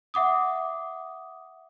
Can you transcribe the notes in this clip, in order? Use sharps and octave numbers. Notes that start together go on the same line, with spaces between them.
E5 F#5 D6 D#6